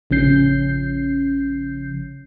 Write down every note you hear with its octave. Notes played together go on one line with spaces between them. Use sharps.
A1 C#3 F3 C#4 G6 C7